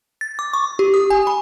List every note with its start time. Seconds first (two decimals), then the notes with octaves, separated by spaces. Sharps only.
0.21 A6
0.39 D6
0.53 C#6
0.79 G4
0.94 D#6
1.10 G#5
1.27 B5